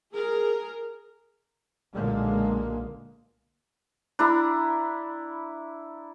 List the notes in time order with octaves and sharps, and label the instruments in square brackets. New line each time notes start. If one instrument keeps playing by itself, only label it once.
[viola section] G#4 A#4
[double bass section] B1 A#2 D3 G#3 A#3
[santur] D4 E4 A#5 B5